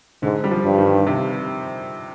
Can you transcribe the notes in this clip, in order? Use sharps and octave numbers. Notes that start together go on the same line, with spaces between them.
G#2 D3
G3
F3
G2
D#3
C3